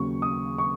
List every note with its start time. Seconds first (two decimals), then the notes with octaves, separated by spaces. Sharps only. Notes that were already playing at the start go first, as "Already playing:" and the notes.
Already playing: D#2 C#3 F#3 C#6
0.22 D#6
0.58 C#6